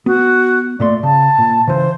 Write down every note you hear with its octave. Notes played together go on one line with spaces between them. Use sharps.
B3 F#4
A#2 A3 D5 C6
C#3 A5
A#2
C#3 E3 C5